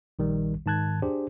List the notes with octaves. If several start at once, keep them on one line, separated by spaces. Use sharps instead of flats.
A#1 D#3 G3
G#2 D#3 A5 F#6 G#6
D4 G4 G#4 C5